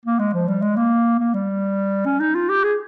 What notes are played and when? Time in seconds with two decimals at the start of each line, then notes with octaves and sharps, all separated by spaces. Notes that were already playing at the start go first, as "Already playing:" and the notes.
0.06 A#3
0.19 G#3
0.34 F3
0.48 G3
0.62 G#3
0.76 A#3
1.20 A#3
1.34 G3
2.06 C#4
2.20 D#4
2.35 F4
2.49 G4
2.64 G#4